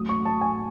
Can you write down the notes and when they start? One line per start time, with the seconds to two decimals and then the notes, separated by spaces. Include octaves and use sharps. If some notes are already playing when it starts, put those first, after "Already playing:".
Already playing: A1 A2 F#3 D#6
0.09 C#6
0.25 A5
0.41 G#5